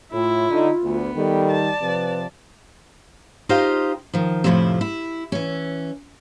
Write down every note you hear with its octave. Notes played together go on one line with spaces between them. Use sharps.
A2 E4 F4
D3 D#4
D2 B3
D#3 G3 A4
D5 A5
C3 F3 B4
D#4 F4 G4 C5 D#5 F5
D#3 F3
F2 A2 C3 F3 E4
E4
E3 C#4